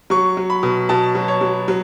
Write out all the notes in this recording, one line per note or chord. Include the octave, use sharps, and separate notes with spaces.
F#3 C#6
F#3
B5
B2
B2 A5
F#3
C#5
F#3
F#3